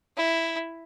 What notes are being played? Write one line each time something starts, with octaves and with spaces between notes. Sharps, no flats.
E4